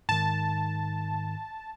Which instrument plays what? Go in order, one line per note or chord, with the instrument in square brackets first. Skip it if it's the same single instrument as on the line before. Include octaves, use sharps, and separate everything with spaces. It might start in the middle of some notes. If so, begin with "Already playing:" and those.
[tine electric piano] G#2 D#3 [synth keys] A5